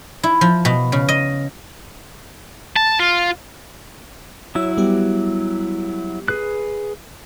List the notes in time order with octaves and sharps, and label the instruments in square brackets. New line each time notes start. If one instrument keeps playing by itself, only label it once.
[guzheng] E4
F3
B2
C#3
D#5
[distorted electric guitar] A5
F4
[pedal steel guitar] F#3 E4 [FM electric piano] C#5 E6
[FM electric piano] G3 B3 G4
[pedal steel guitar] G#4 B4 F#6